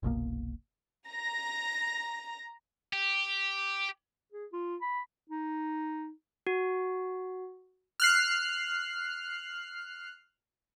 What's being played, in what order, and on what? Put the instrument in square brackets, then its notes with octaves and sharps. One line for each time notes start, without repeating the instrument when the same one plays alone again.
[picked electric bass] F#1 C2 B2 A#3
[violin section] A#5 A#6
[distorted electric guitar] G4
[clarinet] G#4
F4
B5
D#4
[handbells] F#4
[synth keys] F6 F#6 C7